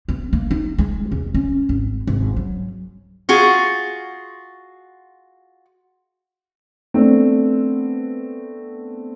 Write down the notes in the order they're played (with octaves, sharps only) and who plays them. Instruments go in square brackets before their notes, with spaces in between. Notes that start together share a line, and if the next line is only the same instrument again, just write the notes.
[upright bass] B3
A#3
D#4
G#3
E2
C#4
G#1
G#1
F#3
[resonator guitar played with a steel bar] F4 F#4 G#4
[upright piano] A3 B3 C4 D4